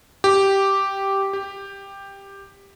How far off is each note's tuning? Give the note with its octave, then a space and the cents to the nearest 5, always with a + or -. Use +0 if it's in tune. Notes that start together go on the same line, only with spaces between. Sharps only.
G4 -5
G4 +10